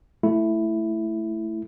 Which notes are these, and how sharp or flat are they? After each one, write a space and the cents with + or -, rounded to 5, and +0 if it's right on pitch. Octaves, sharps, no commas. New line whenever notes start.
A3 +0 E4 +5